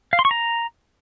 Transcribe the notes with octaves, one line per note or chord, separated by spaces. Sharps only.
F5
C6
C#6
A#5